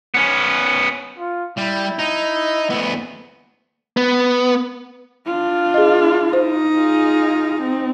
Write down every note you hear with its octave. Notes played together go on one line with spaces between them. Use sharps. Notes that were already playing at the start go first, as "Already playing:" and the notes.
B3 C#4
F4
G3 E4
D#4
D2 B3
B3
D4 F4
G#4 D#5
D#4 C5
F4 G#4
C4